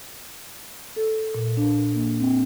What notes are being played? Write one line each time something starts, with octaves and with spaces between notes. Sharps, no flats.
A4
A#2
D4
A#3
C4